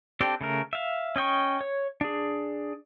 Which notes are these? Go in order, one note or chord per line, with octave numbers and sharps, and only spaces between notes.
C4 D4 G4 A4
C#3 A3 A#4
E5 F5
C#4 D#5 G5 C#6
C#5
D4 G#4